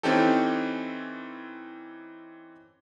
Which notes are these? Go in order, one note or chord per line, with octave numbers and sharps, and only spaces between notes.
E3 C4 C#4 D#4 G4 A4